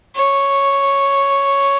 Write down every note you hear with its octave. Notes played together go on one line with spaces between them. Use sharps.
C#5